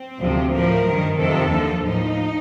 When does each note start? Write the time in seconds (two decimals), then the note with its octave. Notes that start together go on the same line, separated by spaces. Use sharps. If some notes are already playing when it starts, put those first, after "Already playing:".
Already playing: C4
0.20 D2 C3 F3
0.53 A2 F3 A#4
0.86 G2 D#3
1.17 F2 C3 D#3 A4
1.50 D#2 D3 F3
1.83 A2 F3 D#4